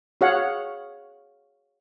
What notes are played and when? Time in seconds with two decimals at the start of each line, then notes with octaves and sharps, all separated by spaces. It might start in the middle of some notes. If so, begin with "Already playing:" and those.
0.21 F#4 G#4 C#5 F5 F#5